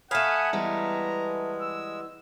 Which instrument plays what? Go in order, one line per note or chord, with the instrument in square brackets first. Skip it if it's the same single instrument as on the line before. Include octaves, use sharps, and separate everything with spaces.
[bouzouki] A3 F5 [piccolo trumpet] F#5 [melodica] G#5 B5 D#6
[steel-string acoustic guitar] E3 G3 B3 [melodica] G#3 [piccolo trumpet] A#5
[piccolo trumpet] E6